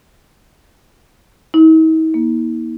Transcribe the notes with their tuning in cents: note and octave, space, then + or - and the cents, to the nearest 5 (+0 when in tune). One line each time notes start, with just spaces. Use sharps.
D#4 +45
A#3 +35